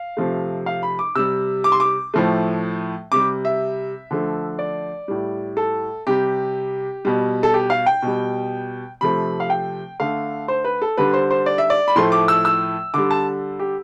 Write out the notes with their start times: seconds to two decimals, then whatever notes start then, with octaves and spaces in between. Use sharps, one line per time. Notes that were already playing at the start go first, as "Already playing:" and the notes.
Already playing: F5
0.17 C3 F3 A3
0.66 F5
0.83 B5
0.99 D6
1.15 C3 G3 E6
1.64 D6
1.72 C6
1.80 D6
2.14 A2 F3 A3
3.12 C3 G3 D6
3.45 E5
4.11 D3 F3 A3
4.59 D5
5.08 A2 G3
5.57 A4
6.07 C3 G3 G4
7.05 B2 G3
7.43 A4
7.54 G4
7.70 F5
7.86 G5
8.02 B2 G3
9.01 C3 F3 A3 B5
9.40 F5
9.50 G5
10.00 D3 A3 F5
10.48 C5
10.64 B4
10.82 A4
10.97 D3 G3 B4
11.14 C5
11.31 C5
11.46 D5
11.58 E5
11.70 D5
11.88 B5
11.96 A2 F3 A3 C6
12.12 D6
12.28 E6
12.45 E6
12.94 D3 G3 D6
13.11 A5
13.59 G4